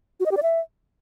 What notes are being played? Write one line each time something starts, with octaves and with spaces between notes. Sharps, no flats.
F#4
D#5
G4
D5
E5